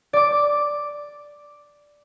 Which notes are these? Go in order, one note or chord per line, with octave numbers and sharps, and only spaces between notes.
D5 D6